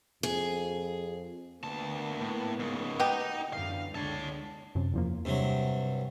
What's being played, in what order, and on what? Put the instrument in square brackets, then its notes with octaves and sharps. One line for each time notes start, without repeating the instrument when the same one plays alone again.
[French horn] F2 [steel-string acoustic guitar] G#4
[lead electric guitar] D2 A5 [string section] A#3 B3
[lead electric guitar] A2
G#2 C#3
[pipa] B2 G4 [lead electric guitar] D#4
[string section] F#2 D3 E3 [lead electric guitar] F5
[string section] C#2 D3 G#3 [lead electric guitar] C#5 A5
[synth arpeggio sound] F#2 C3
E2 F3 A#3
[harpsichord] G2 C3 F#3